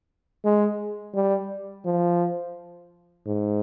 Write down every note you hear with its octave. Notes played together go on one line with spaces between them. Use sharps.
G#3
G3
F3
G#2